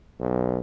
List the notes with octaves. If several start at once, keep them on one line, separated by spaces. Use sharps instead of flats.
B1